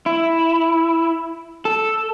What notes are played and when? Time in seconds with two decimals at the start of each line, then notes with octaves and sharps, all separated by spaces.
0.06 E4
1.65 A4